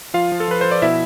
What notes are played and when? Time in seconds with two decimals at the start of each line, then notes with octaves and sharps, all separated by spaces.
0.14 F3 F4 F5
0.32 F3
0.40 A4
0.48 F3 B4
0.61 F3 C5
0.71 D5
0.82 B2 E4 E5